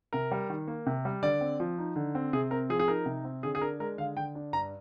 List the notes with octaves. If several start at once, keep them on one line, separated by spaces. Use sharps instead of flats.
C3 A#4
G3
D#3
A#3
C3
G3
D3 D5
C4
F3
D#4
D3
C4
C3 G#4
C4 A#4
F3 G#4
G#4
D#4 A#4
C3
C4
D3 G#4
G#4
D4 A#4
G#3 A#4
D3 F5
D3 G5
D4
G2 A#5